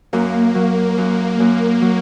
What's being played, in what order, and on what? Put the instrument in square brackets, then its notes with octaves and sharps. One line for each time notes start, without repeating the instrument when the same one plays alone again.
[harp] F#2 [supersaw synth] A#3
[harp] F#3
F#2
F#2
F#3